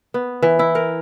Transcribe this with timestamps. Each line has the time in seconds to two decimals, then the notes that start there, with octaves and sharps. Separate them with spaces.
0.14 B3
0.43 E3
0.59 E4
0.75 A#4